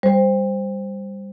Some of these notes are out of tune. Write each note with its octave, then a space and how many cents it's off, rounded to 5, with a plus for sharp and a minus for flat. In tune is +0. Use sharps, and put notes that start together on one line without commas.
G3 +15 C5 +0